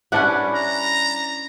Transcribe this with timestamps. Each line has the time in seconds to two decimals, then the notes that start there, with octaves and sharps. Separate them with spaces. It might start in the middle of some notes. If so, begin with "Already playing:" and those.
0.12 G3 C#4 D4 E4 B4 F#5
0.55 A#5